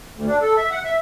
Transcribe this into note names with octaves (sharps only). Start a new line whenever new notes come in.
D2
D4
A4
E5
F#5
E5